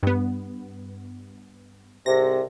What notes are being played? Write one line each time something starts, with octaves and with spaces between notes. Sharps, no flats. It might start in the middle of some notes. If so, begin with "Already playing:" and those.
G2 B3
C2 G#2 C3 A#6